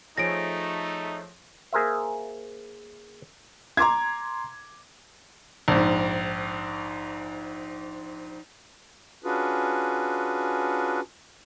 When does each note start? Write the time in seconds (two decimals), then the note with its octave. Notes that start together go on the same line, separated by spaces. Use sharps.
0.17 F3 A3 D#4 G#4 C#5 A#6 D7
1.73 A#3 G#4 A#4 C5 E5
3.77 A#5 C6 D6 G#6
5.68 A#1 G#2
9.24 C#4 D4 F4 F#4 G#4 B4